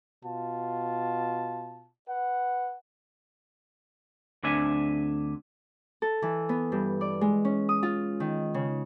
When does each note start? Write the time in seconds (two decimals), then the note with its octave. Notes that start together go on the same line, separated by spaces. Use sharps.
0.24 B2 F4 A5
2.09 B4 F#5
4.44 D2 C4 D4 E5 G#5
6.02 A4
6.22 E3
6.49 B3
6.72 G2
7.01 D5
7.21 G#3
7.45 C#4
7.69 D#6
7.83 F4
8.20 D#3
8.54 C#3